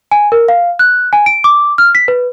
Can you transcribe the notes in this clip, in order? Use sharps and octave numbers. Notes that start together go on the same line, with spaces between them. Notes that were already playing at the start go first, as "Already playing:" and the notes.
G#5
A#4
F5
F#6
G#5
D7
D6
F6
B6
B4